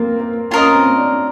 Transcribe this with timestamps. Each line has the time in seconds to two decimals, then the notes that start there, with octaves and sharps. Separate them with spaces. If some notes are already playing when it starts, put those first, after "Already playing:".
Already playing: A#3 C4 F4
0.20 A#3
0.51 C#4 F4 A#4 D#5
0.75 C4
0.98 D4